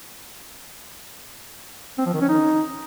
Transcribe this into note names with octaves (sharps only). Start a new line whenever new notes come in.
C4
F3
D#3
C#4
D#4